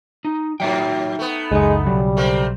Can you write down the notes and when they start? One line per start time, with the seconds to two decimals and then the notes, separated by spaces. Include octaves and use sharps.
0.25 D#4
0.60 A2 F#3 D#4 E5 G5
1.19 A3 B3
1.51 F#1 C#2 G#3 D#4 D#5
1.86 B1 C#3 F#3 G3
2.17 A3 A#3 C4